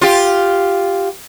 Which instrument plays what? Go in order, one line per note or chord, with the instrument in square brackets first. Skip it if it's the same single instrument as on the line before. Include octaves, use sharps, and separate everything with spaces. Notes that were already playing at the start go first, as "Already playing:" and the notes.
[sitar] F4 G4